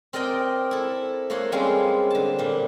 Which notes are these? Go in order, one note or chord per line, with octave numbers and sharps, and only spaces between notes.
C4 A#4 D5 D#5 G5
E4 A4
A#3 A4 C#5 F#5 C6
G3 G#3 A#3 C4 C#4
D3 A5
A#2 G3